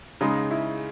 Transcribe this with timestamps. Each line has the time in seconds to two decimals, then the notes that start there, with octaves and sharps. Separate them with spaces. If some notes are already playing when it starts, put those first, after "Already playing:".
0.21 C#3 G#3 D#4
0.51 E4